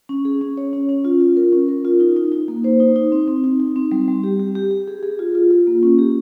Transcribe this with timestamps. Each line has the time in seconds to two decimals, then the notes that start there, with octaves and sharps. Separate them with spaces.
0.09 C#4
0.25 G#4
0.41 C#4
0.57 C#5
0.73 C#4
0.89 C#4
1.05 F4
1.21 F4
1.37 A#4
1.52 C#4
1.68 A#4
1.85 F4
2.00 D#4
2.16 D#4
2.32 D#4
2.48 A#3
2.64 C5
2.80 D#4
2.96 D#4
3.12 C4
3.28 C4
3.44 D#4
3.60 D#4
3.76 C4
3.92 G3
4.08 G3
4.24 G4
4.39 G4
4.55 G4
4.71 G4
4.88 G#4
5.03 G#4
5.19 F4
5.35 F4
5.51 F4
5.67 A#3
5.83 C#4
5.99 G4